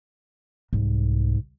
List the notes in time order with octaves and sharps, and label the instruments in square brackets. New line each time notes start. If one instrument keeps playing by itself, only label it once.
[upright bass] C2 [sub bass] G#2